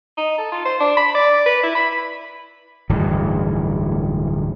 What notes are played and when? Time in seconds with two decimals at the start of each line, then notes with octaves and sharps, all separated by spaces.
0.18 D#4
0.38 A4
0.52 F4
0.65 C5
0.80 D4
0.97 B5
1.15 D5
1.46 B4
1.63 E4
1.75 B5
2.89 D1 G2 D#3 E3